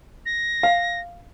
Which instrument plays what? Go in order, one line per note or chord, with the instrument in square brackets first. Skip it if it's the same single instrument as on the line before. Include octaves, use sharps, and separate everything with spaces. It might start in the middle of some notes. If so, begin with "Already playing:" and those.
[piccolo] A#6
[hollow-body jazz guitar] F5